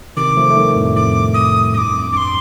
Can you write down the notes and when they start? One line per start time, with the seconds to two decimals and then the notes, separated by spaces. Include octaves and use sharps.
0.17 C3 D#3 D6
0.37 F3 A3
0.50 A3
0.56 D#3 G3
0.76 F2 A2
0.95 F2 A2 D6
1.34 D#6
1.74 G2 D6 D#6
1.94 F2
2.13 G2 C6 D6